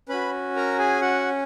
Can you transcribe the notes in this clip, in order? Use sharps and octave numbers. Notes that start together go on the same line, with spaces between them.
C#4 F#4 B4 B5
A#4 A#5
G#4 G#5
F#4 F#5